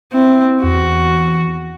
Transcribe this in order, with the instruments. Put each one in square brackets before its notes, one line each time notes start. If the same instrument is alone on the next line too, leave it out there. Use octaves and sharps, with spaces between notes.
[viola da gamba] C4 [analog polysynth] E4
[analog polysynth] E2 [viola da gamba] F#4